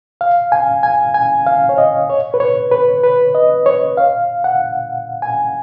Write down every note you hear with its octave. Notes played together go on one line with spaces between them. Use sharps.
F5
G#5
G#5
G#5
F5
C#5
D#5
C#5
B4
C#5
B4
B4
D#5
C#5
F5
F#5
G#5